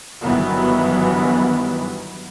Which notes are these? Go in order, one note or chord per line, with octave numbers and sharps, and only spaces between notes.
G1 G2 D#3 E3 F#3 B3